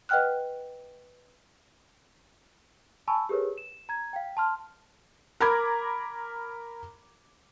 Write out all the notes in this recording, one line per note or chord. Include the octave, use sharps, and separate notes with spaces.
B4 D#5 F#5 G5 F6 F#6
G#5 A5 B5 C#6 E6
G4 G#4 A#4 B4 C#5
E7
A#5 G#6
F5 G5
A5 C6 F6
A#4 A#5 B5 D6 G#6